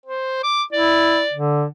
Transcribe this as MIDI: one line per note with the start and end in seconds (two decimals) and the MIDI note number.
0.06 0.39 72
0.43 0.63 86
0.73 1.22 64
0.73 1.37 74
1.33 1.65 50